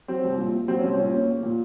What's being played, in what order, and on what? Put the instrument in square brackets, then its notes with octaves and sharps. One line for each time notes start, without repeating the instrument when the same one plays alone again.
[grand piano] F#3 C4
C2
A#2
A#3
F#3 C4
C#4
C2
C4
A#2 C#4
A#3
A#3
A#2